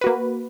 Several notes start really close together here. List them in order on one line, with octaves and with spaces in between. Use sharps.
B4 F#4 A#3